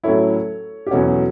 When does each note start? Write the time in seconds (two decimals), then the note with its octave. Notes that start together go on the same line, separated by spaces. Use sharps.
0.04 A2 F#3 C#4 E4 A4 C#5
0.87 G4
0.91 E2 B2 F#3 C#4 F#4 A4